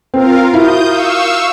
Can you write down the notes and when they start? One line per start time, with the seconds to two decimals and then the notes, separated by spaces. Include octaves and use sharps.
0.14 C4 F4 A#4 F5
0.54 E4 F#4 D#6 G6
0.87 F5 C#6 E6